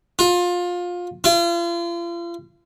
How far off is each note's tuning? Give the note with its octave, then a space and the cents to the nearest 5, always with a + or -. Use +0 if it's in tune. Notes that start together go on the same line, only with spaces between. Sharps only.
F4 +20
F4 -40